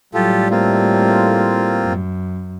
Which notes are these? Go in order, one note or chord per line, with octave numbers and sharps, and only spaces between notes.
A2 F#3 G3 F4 G4 A4
A3 A#3 C4 F4
F#2